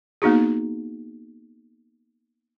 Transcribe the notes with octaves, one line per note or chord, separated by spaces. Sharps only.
A#3 B3 D#4 F#4 G#4